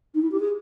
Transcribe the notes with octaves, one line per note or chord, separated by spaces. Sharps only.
D#4
E4
G4
G#4